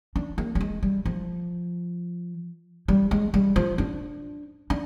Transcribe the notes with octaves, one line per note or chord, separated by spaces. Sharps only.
D4
A#3
G3
G#3
G3
F3
G3
G#3
G3
F3
D4
D4